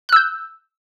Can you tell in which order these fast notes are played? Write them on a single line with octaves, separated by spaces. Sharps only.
F#6 E6 G6